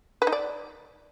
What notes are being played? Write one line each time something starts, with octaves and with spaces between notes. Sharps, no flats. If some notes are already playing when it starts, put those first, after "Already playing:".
B4
D#4
D5